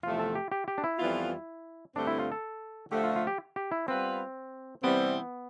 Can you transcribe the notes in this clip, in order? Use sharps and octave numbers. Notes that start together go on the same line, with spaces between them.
E2 C3 F3 A3 F4
A4
G4
G4
G4
D4
E4
F2 E3 G3 B3 F4
G2 D3 A3 C4 D4
E4
F4
A4
D3 F3 A3 G4
F4
F4
G4
G4
E4
G3 B3 C4 F4 B4
C3 E3 G3 B3 C4